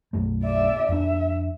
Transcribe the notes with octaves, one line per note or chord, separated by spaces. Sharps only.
B1 F#2 A3
D5 E5
F2 D4 E5